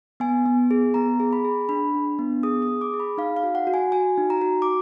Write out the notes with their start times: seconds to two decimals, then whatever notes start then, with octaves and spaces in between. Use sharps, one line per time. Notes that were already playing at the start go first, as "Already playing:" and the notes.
0.20 B3 G#5
0.46 B3
0.71 G#4
0.94 B3 A#5
1.20 G#4
1.33 B5
1.45 G#4
1.69 D4 B5
1.94 D4
2.19 B3
2.43 G#4 D#6
2.62 D#6
2.68 G#4
2.81 D6
2.94 G#4
3.00 B5
3.18 D#4 F5
3.37 F5
3.43 F#4
3.55 F#5
3.67 F#4
3.74 G#5
3.92 F#4 G#5
4.18 D#4
4.30 A#5
4.41 F#4
4.62 D6